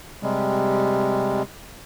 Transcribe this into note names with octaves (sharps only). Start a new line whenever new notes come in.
C3 G3 G#3